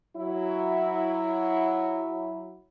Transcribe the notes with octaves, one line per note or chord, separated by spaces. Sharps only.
F#3 E4